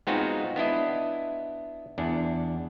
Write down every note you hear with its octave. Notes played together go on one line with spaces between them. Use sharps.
G#3 B3 C4 D#4 F4 F#4
B3 D4 E4 D#5
E2 D4